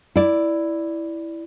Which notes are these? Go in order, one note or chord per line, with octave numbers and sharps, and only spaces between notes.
E4 D5